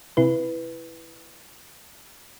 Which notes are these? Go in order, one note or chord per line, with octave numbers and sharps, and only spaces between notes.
C3 E4 B4